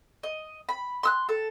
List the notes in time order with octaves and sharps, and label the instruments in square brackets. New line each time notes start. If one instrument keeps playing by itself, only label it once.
[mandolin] D#5
B5
C6 E6 F#6
A4